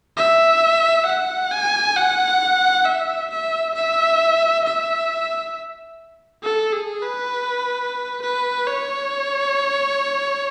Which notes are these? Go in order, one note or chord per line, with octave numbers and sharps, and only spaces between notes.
E5
F#5
G#5
F#5
E5
E5
E5
E5
A4
G#4
B4
B4
C#5